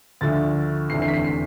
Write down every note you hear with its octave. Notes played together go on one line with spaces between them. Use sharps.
D2 D3 F3 A3 A6
F1 E2 D3 A3 C7
C7
B6
C7
C7